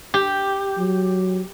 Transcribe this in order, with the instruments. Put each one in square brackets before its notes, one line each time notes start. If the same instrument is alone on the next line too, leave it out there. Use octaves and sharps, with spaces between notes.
[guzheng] G4
[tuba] F#3